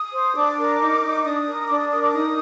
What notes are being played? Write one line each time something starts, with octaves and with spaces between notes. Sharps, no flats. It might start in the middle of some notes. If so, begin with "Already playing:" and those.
Already playing: D#6
C5
D4 D6
A#4
D#4
D#4
D4 D#6
A#4
D4 D6
D#6
A#4 D#6
D6
D#4 D#6